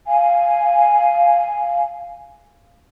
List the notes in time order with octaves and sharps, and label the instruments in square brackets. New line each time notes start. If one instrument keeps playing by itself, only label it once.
[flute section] F5 G#5